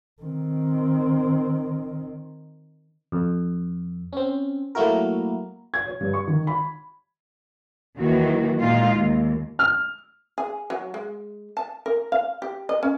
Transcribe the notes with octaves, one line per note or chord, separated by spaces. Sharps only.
D#3 C4
F2
C4 C#4
F#3 A3 A#3 E4 F#4 A#4
G#6
C#5
G2
C#6
D#3
B5
D#2 D#3 E3 F#3 F#4
A#2 G#3 D#4 F4 F5
D#2
F6
G#4
F#3
G#3
A5
A#4
F5
G4
D#5
C#4